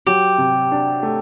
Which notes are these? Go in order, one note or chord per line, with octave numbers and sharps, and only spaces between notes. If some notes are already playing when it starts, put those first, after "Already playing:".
F#3 G4
C3
D4
A3